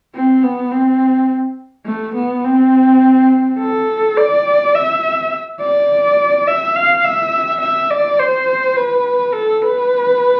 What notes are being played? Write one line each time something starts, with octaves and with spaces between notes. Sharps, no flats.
C4
B3
C4
A3
B3
C4
A4
D5
E5
D5
E5
F5
E5
E5
D5
C5
B4
A4
B4